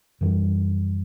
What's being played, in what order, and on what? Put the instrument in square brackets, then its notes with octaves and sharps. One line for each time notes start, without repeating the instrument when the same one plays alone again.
[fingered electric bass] F#2 E3 G3